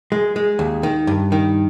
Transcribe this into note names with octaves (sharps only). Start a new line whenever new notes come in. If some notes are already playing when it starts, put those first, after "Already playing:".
G#3
G#3
D#2
D#3
G2
D#3